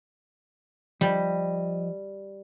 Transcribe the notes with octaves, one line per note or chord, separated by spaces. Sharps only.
F3 G3 D#5